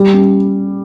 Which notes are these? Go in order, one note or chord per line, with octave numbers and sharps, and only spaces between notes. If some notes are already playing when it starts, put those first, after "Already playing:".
Already playing: G3
C#4